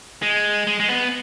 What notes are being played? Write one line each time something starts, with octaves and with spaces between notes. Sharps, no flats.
G#3
G#3
G#3
B3